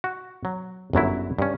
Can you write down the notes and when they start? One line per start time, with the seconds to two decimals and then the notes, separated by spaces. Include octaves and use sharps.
0.04 F#4
0.45 F#3
0.93 G1 F#2 F#3 E4
1.39 G2 C#4